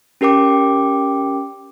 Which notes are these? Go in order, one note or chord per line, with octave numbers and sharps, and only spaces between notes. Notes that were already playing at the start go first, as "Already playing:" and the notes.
C#4 G4 A#4 G5 D6